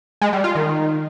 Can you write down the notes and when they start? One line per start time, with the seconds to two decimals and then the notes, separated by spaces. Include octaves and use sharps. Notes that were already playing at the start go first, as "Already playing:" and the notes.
0.21 G#3
0.33 G3
0.44 F4
0.55 D#3